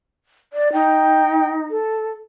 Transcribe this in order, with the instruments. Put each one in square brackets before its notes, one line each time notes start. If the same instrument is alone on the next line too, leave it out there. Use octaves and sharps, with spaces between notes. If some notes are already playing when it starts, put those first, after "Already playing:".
[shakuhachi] D5
[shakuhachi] D#4 [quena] G5
[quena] A4